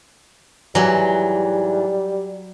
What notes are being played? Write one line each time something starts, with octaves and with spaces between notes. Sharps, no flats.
G#2 E3 F#3 G3